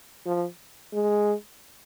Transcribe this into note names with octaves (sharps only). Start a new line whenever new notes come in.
F3
G#3